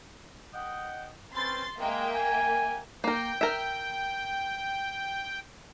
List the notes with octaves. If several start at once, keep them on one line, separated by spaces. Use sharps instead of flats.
D#5 F#5 G5
C4 C#4 B4 C6 A6
G#3 A#3 E5 G5
G#5
A#3 A#4 G5
A#4 E5